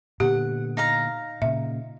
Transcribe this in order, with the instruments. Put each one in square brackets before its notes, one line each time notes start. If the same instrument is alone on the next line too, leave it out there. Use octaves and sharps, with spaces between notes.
[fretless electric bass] A#2 D3 B3 [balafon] G4 [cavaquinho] F#5
[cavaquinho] D#4 F5 A#5
[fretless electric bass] A#2 C#3 [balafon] E5